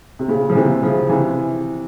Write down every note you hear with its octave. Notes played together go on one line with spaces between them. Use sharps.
C3
A#2 C#3
F3
C3 E3
C#3 F3
C3 E3